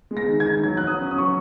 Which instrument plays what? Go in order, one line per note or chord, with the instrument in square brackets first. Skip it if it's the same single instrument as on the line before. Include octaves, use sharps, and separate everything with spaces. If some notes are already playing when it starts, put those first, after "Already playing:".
[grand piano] G#3
[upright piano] A#6
[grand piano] D#3
[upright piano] G#6
[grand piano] D#3
[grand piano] F#3 [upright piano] G#6
[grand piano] F#3 [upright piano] F#6
[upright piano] D#6
[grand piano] C#4
[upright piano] D#6
[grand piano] F#3 [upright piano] C#6